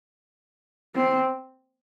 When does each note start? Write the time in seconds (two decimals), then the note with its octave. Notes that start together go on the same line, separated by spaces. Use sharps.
0.95 C4